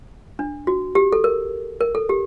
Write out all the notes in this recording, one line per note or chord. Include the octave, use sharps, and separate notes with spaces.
D4
F#4
G4
A4
A#4
A#4
A4
G4